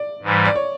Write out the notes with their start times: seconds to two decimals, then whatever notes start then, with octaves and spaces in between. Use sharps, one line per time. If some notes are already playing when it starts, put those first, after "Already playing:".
Already playing: D5
0.23 G#2 E3 G3
0.45 D5
0.56 C#5